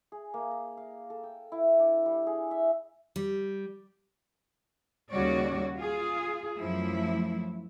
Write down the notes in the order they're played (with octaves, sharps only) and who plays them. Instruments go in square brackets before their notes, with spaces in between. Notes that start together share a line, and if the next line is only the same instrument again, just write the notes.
[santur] G#4
A#3
A#5
F5
A4
G5
E4
E4
D4
G3
G#4
E5
[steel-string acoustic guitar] G3
[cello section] D#2 C#3 G3 F#4 C#5 D5
F4 G#4
F#2 F3 A3 E4